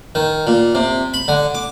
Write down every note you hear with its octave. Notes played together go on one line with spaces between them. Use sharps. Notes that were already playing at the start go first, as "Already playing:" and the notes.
D#3
A#2
C3
B5
D3
D6